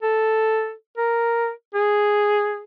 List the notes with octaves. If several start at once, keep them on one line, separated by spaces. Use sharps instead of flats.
A4
A#4
G#4